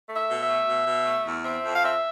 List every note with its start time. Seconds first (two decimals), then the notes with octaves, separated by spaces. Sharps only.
0.09 A3
0.16 E5
0.29 B2
0.42 E5
0.48 A3
0.67 B2
0.86 B2
1.06 A3
1.25 E2
1.45 C4 E5
1.64 F2
1.75 F5
1.83 C4 E5